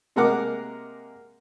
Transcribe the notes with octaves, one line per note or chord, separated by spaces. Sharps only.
C3 G#3 A#3 A#4 F#5 D6